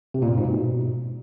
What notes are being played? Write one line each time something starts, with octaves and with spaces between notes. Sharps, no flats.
C3
A#2
G2
G#2
B2